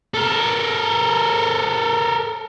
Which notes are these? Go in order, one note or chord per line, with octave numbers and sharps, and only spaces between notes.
A4 A#4